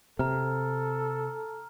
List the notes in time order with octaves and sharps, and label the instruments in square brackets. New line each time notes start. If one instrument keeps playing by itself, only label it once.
[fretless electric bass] C3 [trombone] A4 [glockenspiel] A#5 F6